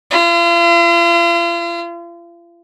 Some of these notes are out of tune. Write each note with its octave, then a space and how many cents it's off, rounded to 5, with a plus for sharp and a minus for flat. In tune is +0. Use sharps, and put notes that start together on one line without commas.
F4 -40